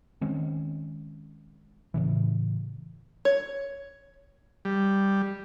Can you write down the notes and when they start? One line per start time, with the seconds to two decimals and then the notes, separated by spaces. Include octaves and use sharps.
0.21 D#3 G#3 C4 C#4
1.94 A2 C#3 E3
3.25 C#5
4.65 G3